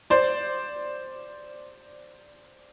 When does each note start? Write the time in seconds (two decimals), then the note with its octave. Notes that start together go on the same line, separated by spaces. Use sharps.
0.10 C5 D5